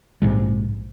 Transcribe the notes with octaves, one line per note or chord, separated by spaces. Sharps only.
A#1 G#2 C3 G#3